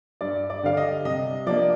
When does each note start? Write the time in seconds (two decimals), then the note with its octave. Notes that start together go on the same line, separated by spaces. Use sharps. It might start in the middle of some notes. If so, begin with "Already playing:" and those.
0.21 G2 D5
0.50 D5
0.63 D3 G3 D4 F5
0.77 D#5
1.05 C3 D#5
1.46 F3 A#3 D4 D5